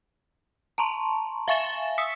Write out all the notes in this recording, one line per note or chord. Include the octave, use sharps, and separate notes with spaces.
A5 A#5 C6 C#6
E5 F5 G#5 C#6 A6 E7
D#6 E6 B6 C#7